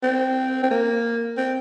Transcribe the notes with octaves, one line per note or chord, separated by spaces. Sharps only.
C4
C4
A#3
C4